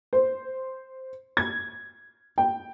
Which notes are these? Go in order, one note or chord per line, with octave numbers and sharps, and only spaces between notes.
C5
G#6
G5